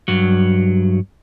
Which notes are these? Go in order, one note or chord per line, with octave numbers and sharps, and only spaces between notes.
G2 F#3